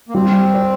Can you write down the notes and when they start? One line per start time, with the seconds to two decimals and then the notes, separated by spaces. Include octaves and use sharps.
0.09 A#3
0.14 G3 C4
0.54 D5